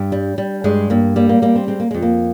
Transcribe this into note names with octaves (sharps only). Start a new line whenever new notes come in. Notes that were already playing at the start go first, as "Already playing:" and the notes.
Already playing: G2
G3
G3
G2 G#3
G2 A#3
G3 A#3
A#3
G3 A#3
C4
G#3 C4
A#3
F2 G#3
A#3